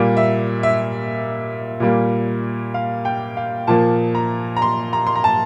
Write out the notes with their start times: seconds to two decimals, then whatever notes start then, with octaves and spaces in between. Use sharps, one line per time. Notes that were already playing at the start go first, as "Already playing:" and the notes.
Already playing: A#2 G3 A#3
0.17 E5
0.63 E5
1.80 A#2 G3 A#3
2.74 F5
3.05 G5
3.37 F5
3.67 A#2 F3 A#3 A5
4.15 A#5
4.57 A#5
4.62 C6
4.93 A#5
5.07 C6
5.15 A#5
5.24 A5